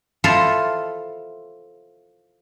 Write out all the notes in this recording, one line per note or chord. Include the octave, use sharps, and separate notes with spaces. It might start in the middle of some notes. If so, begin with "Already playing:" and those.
E4 F4 A4 C5 D#5 F5